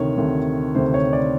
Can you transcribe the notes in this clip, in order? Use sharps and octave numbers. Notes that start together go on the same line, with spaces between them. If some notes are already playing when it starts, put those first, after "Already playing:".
Already playing: D2 C3 D#3 C#5
D2 C3 D#3
D2 C3 D#3 C5
C#5
D5